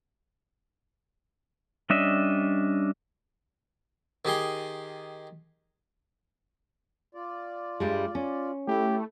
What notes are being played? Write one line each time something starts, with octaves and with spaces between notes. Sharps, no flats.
G3 C#4 D4 D#5 E5
D#3 G4 G#4 C6
F4 D5
G2 G3 G#3
C#4
A3 E4 G4